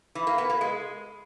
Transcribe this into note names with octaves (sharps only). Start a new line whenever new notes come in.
E3
A#3
B3
A#3
G#3